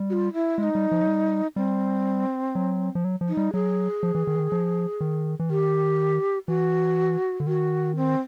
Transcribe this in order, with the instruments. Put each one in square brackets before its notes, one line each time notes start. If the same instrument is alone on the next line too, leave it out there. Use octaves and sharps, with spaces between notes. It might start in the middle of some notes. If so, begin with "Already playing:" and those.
Already playing: [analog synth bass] G3
[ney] F#4
F4
E4
[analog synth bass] G#3 [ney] E4
[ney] D#4
[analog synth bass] G3
F3
F#3
G3
[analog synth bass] G3 [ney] C4
[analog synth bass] F#3
F3
F#3
F3
[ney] D#4
[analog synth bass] G3
[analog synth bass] F#3 [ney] G#4
[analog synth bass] F3
E3
D#3
E3
D#3
F3
D#3
E3
[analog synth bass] D#3 [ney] G4
[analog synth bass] E3 [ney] F#4
[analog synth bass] D3
[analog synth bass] D#3 [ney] F#4
[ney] C4